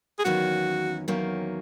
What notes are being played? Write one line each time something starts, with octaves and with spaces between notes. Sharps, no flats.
G#4
E2 D#3 F#3 A#3 C#4 F#4
E2 D#3 F#3 A#3 C#4